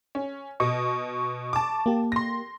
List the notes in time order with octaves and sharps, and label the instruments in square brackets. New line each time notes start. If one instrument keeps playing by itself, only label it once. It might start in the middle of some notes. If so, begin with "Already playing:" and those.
[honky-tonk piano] C#4
[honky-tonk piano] B2 D#5 [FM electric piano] C#6
[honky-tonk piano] A5 D6
[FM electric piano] A#3 G4
[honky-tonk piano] C6 A#6